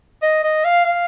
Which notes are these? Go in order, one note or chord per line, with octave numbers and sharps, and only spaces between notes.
D#5
D#5
F5
F5